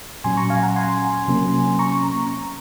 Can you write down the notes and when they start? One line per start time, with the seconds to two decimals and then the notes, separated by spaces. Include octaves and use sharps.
0.24 A#2 F#3 C#4 G#5 C6
0.37 A#5 C#6
0.50 F5 G#5
0.63 F#5 A#5
0.76 G#5 C6
1.28 C3 F#3 A#3 C#4
1.79 A#5 C#6